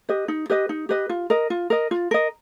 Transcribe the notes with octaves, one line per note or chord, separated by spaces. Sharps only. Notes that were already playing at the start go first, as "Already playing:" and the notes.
G4 B4 D#5
D#4
G4 B4 D#5
D#4
G4 B4 D#5
F4
A#4 D#5
F4
A#4 D#5
F4
A#4 D#5